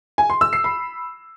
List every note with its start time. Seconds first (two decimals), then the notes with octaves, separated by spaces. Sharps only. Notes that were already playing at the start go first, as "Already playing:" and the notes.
0.18 G#5
0.30 C6
0.41 E6
0.53 C7
0.64 B5